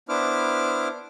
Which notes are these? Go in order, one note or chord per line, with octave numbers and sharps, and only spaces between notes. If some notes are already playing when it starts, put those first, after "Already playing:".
B3 D4 E4 C5 D6 F6